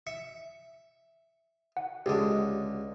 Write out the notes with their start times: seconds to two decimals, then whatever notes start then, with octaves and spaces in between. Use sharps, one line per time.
0.07 E5 C#7
1.77 F#5
2.06 C#2 D3 G#3 G4